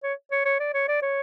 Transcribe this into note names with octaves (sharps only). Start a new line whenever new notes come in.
C#5
C#5
C#5
D5
C#5
D5
C#5